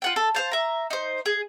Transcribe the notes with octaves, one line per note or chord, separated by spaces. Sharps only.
F4 F#5 G5
A4
C5 F5 A5
E5 A#5
D#4 C5
G#4